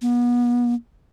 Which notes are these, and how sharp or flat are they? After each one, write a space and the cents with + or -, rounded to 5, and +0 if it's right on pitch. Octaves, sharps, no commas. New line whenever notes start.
B3 -35